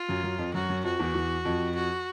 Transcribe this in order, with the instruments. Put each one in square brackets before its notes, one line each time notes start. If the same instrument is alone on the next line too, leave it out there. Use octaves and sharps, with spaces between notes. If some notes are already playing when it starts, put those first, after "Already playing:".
Already playing: [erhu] F4
[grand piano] F#2 F#3
F#2 F#3
F2 F3
[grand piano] F#2 F#3 [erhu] F#4
[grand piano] F#2 F#3
[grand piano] F2 F3 [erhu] F#4
[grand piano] E2 E3
E2 E3
F2 F3
[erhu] F#4